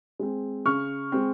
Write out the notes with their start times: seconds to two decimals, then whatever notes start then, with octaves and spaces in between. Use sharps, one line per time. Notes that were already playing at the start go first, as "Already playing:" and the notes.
0.19 G#3 C4
0.66 C#3 C#6 F6
1.12 G#3 C4